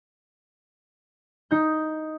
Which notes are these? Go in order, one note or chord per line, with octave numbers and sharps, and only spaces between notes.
D#4 G6